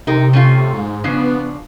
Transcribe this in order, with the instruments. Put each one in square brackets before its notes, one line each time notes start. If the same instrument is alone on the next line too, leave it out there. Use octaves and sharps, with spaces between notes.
[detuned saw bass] C3 [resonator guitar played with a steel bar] D#4 A#4
[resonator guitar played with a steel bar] A3 C#4 F4
[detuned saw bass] G#2
[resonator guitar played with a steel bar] C#3 F3 D4 [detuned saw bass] B3